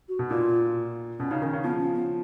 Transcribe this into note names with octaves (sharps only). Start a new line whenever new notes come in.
F#4
B2
A#2 F4
B2 C#4
C#3 D#4
D#3 C#4
C#3
F3 B3
C#4
B3